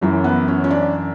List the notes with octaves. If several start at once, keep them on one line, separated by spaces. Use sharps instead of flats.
F#2 E3 C#4
B3
C#4
C#4
D4